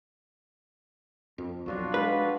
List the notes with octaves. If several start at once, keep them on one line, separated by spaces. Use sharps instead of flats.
F2
B1 F2 F#3 D4 F4 F#4
G#3 B4